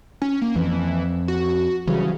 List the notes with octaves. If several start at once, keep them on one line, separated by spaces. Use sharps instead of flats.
C#4
A#3
F2 E3
F#4
C#3 E3 F#3 G3